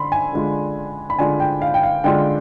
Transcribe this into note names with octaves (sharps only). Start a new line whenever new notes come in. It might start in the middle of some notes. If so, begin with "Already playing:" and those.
Already playing: D3 B5 C6
G#5
D3 G#3 D4 F4
B5
D3 G#3 D4 F4 G#5
G5
F5
G5
F5
D3 G#3 D4 F4 G5